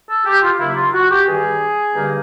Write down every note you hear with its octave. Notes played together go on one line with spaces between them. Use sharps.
A4
G4
F4
D#2 C#3 F#3 A#3 E4
F4
F#4
G4
G2 D#3 G3 G#4
G2 D3 G3 A#3 D#4